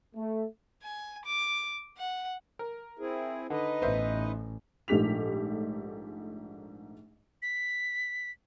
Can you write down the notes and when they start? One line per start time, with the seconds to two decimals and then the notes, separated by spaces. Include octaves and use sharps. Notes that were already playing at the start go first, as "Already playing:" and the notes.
0.16 A3
0.83 G#5
1.25 D6
1.98 F#5
2.59 A#4
2.99 C4 E4 G#4
3.50 D3 D#4 B4 D#5
3.82 A1 B3 C5 E5
4.88 A#1 G#2 A3 G4 B6 F7
7.42 B6